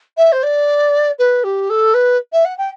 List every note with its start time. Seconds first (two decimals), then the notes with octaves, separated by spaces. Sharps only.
0.17 E5
0.32 C5
0.43 D5
1.18 B4
1.43 G4
1.69 A4
1.94 B4
2.32 E5
2.45 F#5
2.58 G5